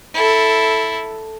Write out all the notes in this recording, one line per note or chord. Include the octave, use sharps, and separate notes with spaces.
E4 A4